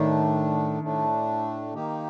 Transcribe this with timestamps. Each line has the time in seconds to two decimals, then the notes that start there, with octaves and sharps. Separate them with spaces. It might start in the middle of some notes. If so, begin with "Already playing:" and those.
Already playing: A2 D#3 A3 D4
0.82 A2 A3 D4
1.74 D#3 A#3 D#4 G4